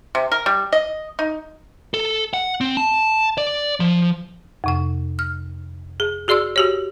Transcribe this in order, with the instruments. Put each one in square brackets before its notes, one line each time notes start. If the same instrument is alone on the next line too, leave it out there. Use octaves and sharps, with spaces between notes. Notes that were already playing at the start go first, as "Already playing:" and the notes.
[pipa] C3
A#4
G3
D#5
D#4
[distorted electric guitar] A4
F#5
C4
A5
D5
F3
[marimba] F2 C3 F#5
F6
G#4
F#4 G#4 D5 C6 E6
F#4 G4 C#5